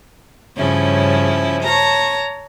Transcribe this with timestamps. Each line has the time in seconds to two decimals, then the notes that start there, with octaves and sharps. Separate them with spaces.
0.56 G2 C#3 F3 C#4 E4
1.64 C#5 A5 A#5